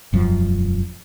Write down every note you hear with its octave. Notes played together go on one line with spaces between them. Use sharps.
E1 F#2 F3